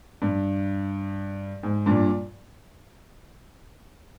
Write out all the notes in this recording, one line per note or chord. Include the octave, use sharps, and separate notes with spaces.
G2
G#2
G2 A#2